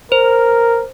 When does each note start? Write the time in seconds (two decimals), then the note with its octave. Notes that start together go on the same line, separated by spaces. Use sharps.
0.12 A#4 C5